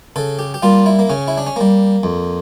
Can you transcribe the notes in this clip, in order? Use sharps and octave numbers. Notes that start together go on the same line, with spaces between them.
C#3 A4
G4
G4
G3 A#3 F4
E4
A#3
C#3 C#4
E4
D4
C#4
G3 A#3
F2